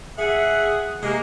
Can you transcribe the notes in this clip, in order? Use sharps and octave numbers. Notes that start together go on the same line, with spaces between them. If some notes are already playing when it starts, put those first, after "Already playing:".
G#4 E5 F#5
C3 G#3 A#3 D#5